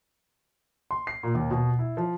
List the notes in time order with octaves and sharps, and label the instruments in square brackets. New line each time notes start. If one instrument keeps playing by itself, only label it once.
[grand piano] C6
C7
A#2
D#2
B2
E4
F3